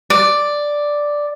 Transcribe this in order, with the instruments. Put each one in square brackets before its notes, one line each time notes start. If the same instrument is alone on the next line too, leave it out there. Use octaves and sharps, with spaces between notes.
[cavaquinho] D5